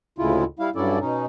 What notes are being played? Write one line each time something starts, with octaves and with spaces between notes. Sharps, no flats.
D2 A2 C#3 G#3 E4 F4
G3 E4 F5
G2 F#3 C#4 E4 A4 D5
B2 C#4 D#4